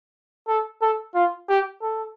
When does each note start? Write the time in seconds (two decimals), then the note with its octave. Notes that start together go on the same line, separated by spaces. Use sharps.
0.48 A4
0.82 A4
1.15 F4
1.49 G4
1.83 A4